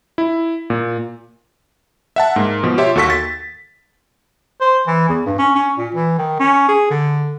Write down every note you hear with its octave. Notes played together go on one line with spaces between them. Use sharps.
E4
A#2
E5 F#5 A5
G#2 A#3
B2 F3
F4 G4 C#5 E5 C6
D#2 F#4 A4 C#6 B6
A6
C5
E3
E2
G2
C#4
C#4
A#2
E3
D#3
C#4
G#4
D3